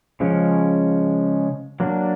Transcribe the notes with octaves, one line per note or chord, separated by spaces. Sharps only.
C#3 F3 G#3 C#4
F#3 A#3 D4